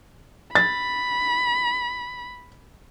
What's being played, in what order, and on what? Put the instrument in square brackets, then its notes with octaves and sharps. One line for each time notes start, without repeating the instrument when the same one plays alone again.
[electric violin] B5 [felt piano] A6